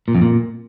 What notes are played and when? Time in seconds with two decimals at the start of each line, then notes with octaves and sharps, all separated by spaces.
0.08 A#2
0.15 F2
0.21 A#2